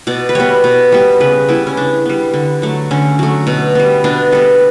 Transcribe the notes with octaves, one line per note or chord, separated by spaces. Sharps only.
B2 D5
B4
G3 B3 C#5
B2
G3 B3
C#3 B4
G3 B3 E4
C#4
C#3 D4
G3 B3
D3
F#3 A3
D3 C#4
F#3 A3
B2
G3 B3
B2 D4
G3 B3 A4